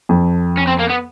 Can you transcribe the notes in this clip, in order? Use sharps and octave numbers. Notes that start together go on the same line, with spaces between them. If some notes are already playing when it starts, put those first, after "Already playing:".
F2
C#4
C4
A#3
B3